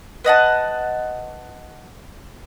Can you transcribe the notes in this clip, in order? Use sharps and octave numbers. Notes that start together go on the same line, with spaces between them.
B4 D#5 F#5 A5